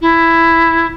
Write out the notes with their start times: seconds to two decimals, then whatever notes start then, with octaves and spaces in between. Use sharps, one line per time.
0.01 E4